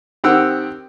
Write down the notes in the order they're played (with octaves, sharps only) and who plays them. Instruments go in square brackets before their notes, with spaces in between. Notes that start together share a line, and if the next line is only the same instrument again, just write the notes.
[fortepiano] D#3 C4 G4 F#5 E6